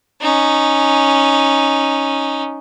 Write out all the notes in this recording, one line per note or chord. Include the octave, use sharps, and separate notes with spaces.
C#4 D#4